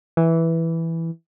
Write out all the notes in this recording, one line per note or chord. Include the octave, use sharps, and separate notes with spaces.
E3